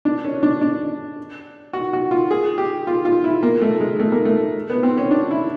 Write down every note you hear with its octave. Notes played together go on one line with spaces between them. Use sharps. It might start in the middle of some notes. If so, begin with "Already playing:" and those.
D4
C#4
D4
D4
F#4
F#4
F4
G#4
G4
F4
F4
E4
A#3
A3
G#3
A3
A#3
A3
B3
C4
C#4
D4
E4